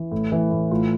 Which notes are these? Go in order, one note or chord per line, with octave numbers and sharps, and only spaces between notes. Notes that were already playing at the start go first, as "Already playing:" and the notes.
Already playing: E3
A2
E3
A2
A2 F4